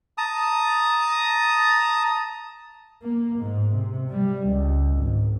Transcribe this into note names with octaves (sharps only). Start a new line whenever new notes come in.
A5 A#5 D#6
A#3
G#2
C3
G3
C#2
G#1